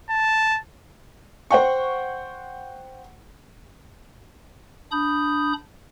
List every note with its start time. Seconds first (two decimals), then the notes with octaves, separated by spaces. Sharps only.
0.10 A5
1.51 C5 F#5 G5 C#6
4.91 D4 B5 D#6 G6